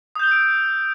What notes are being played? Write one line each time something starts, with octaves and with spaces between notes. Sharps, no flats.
D#6 E6 G6 D7 G7